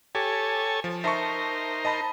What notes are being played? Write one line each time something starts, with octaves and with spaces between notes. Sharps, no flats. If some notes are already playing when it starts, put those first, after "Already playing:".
G4 A4 C#5 G#5
F3
D#4 A#4 C5 E5 A5 C#6
D#5 A5 B5